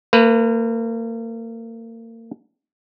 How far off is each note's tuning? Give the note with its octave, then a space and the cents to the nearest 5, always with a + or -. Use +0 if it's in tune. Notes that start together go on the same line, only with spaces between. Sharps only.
A#3 -35 B4 +5